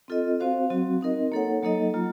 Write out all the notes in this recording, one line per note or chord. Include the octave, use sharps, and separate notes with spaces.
C4 F4 A4 D#5
C4 F#4 C5 F5
F#3 C4 F#4
C4 D#4 A#4 D#5
A#3 D#4 A4 C#5 F#5
F#3 A#3 D#4 A4 D#5
F#3 A#3 F4